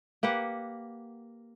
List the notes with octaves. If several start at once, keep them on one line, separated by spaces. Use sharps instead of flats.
A#3 G4 B4 F#5